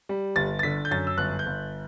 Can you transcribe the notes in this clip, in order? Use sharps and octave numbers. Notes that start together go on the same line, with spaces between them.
G3
G1 A6
A6
D3 B6
G6
F#2 A6
E6
G1 F#6
G6
G1